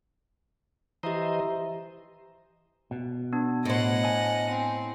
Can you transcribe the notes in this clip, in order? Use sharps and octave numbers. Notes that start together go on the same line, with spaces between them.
E3 G4 C5 D#5 E5 A#5
B2
B3 D4
A2 C5 D#5 F#5
G#5
C4